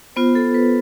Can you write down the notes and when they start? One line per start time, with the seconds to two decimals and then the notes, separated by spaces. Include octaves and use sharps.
0.16 B3 F4 C5
0.35 A4
0.54 B4